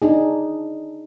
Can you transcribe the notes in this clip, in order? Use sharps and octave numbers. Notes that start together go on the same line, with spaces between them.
D4 D#4 G#4